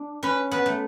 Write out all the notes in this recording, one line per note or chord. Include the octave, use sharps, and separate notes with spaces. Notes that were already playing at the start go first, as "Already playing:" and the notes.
Already playing: D4
C#4 B4
B3 B4
A3